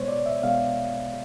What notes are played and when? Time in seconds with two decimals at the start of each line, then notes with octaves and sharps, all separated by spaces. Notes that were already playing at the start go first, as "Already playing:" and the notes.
Already playing: B2 G#3 B3 C5 C#5
0.08 D5
0.26 E5
0.43 B2 G#3 B3 F5